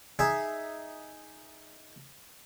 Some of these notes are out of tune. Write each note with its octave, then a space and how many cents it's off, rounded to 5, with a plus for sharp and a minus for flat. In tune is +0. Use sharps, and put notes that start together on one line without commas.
D#4 +0 G#4 +0 E5 +0